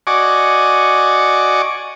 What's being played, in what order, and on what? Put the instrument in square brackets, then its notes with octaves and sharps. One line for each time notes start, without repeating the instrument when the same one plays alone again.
[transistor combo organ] F#4 D5 D#5 G#5 C#6 D6